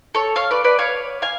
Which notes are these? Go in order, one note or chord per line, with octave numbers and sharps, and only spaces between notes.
A4 C#5
C#5 F5
B4 D5
B4 D5
C#5 F5
F5 G#5